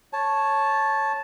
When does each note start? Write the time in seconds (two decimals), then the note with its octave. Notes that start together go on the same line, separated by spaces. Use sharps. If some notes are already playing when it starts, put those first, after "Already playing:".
0.13 C#5 A5